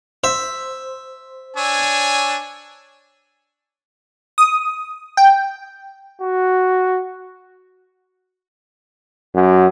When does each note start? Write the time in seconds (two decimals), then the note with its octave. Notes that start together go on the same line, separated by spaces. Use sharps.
0.24 C5 E5
1.57 D4 C#5 G#5 E6
4.38 D#6
5.17 G5
6.22 F#4
9.35 F#2